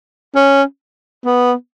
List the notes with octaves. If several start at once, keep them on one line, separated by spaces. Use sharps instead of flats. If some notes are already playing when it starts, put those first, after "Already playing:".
C#4
B3